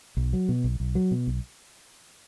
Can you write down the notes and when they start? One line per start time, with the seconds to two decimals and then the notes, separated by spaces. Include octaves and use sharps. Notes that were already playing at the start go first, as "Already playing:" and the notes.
0.17 B1
0.33 F#3
0.49 B2
0.64 B1
0.80 B1
0.95 F#3
1.11 B2
1.27 B1